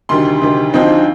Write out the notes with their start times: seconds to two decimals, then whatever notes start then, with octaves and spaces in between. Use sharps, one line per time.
0.09 D2 C3 D#3 G3 C6
0.41 D2 C3 D#3 G3
0.73 D2 D3 F3 C4 D#4